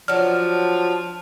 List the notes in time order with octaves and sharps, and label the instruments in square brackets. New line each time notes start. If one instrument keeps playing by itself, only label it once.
[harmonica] F3 [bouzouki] F#3 D4 [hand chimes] F6